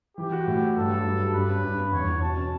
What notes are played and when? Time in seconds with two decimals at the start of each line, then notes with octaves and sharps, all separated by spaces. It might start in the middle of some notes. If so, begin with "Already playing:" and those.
0.17 E3 G4
0.32 F#4
0.47 A2
0.62 A3
0.76 G2 A4
0.91 F#3
1.04 G2
1.19 G3
1.34 G2 B4
1.49 C#4
1.64 G2
1.79 B3
1.92 E2 C#5
2.08 E3
2.22 B2 A5
2.37 C#4